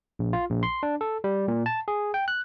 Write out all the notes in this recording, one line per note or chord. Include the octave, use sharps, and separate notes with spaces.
A#1
F4
A#1
C6
D4
A4
G3
A#2
A5
G#4
G5
F#6